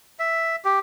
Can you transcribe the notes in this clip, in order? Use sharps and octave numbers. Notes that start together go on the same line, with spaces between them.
E5
G4